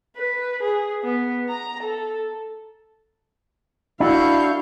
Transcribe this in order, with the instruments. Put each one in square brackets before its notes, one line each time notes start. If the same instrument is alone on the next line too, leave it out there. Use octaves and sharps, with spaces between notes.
[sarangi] B4
G#4
B3
A#5
A4
[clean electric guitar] D4 F#4 A4 [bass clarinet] E4 [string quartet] F5 C#6 G6